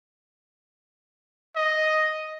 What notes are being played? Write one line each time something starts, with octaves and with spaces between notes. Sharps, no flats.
D#5